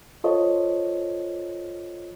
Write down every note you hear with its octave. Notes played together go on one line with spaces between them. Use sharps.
F4 A4 C5 C#5 D#5